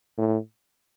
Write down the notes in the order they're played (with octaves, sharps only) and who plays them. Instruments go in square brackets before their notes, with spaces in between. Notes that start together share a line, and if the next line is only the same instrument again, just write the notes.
[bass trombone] A2